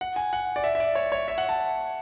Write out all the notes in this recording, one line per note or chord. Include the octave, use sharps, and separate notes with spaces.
F#5
G#5
F#5
D5
E5
E5
D5
C#5
C#5
E5
F#5
A5